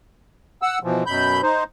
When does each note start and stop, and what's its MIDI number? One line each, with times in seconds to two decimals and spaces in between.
0.62 0.79 78
0.62 0.79 88
0.83 1.04 47
0.83 1.04 52
0.83 1.04 53
1.06 1.41 42
1.06 1.41 47
1.06 1.41 83
1.06 1.41 91
1.42 1.64 63
1.42 1.64 72